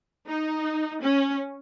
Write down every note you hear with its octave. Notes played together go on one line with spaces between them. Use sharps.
D#4
C#4